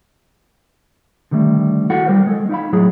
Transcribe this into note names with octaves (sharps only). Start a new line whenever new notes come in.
D3 D#3 G3 A3
E4 F#4 A4 F#5
G3 A#4 C5
G#3 A4
D#4 E4 F5 B5
A2 F#3 E4 G#4